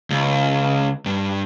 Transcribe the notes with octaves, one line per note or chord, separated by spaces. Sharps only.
C#2
G2